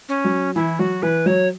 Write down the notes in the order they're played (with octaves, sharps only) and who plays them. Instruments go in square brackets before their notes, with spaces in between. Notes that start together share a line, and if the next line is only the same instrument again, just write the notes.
[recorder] C#4
[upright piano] F#3
[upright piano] E3 [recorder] E4
[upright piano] F#3 [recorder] F#4
[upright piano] E3 [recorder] B4
[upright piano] F#3 [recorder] C#5